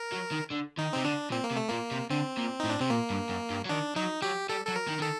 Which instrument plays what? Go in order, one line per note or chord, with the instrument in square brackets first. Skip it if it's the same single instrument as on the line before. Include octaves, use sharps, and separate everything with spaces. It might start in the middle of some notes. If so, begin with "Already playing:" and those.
Already playing: [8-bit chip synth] A#4
[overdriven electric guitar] F#3
D#3
D3
[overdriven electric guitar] D#3 [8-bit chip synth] D#4
[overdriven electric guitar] C3 [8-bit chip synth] C4
[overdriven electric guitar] D3 [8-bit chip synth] D4
[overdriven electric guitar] A#2 [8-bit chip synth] C4
[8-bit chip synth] A#3
[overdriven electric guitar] C3
[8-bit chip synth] A3
[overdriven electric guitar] A#2 [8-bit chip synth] A#3
[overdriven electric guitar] C3
[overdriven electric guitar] D3 [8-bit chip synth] C4
[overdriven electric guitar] A#2
[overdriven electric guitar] A2 [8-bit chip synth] D#4
[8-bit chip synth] D4
[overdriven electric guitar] C3 [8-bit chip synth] C4
[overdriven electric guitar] A#2 [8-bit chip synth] A#3
[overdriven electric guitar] G2
F#2
G2
F#3
[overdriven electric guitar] D#3 [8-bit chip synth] D4
[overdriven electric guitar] F#3 [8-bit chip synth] D#4
[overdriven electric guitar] F#3 [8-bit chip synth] G4
[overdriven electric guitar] G3 [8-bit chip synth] A4
[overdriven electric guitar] F#3 [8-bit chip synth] A4
[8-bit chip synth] A#4
[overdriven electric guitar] D#3
[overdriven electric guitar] D#3 [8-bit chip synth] A4